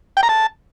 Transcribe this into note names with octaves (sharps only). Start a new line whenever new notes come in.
G5
A#5
A5